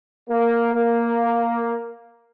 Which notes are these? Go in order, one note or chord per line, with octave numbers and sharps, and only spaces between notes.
A#3
A#3